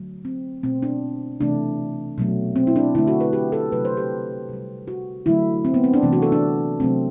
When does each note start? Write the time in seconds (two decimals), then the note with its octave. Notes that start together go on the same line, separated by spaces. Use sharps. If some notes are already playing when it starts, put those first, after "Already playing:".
Already playing: D3 F#3 A3
0.25 C4
0.63 B2 A3 C4
0.83 D4
1.40 C3 E3 A3 D4
2.18 B2 F#3 A3
2.56 C4
2.67 E4
2.76 D4
2.95 D3 A3 E4
3.07 F#4
3.21 B4
3.33 G4
3.52 A4
3.72 C3 F#3 A3 B4
3.85 C5
3.97 G4
4.49 C3 G3
4.88 F#4
5.26 D3 F#3 A3 E4
5.65 C4
5.74 B3
5.84 C4
5.94 D4
6.03 C3 E3 A3
6.13 F#4
6.22 A4
6.32 D4
6.80 C3 F#3 A3 C4